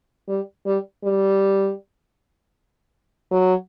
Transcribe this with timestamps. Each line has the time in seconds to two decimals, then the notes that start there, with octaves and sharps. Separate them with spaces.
0.28 G3
0.66 G3
1.04 G3
3.31 F#3